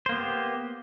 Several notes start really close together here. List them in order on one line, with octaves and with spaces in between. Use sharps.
C5 A#3 B3 G4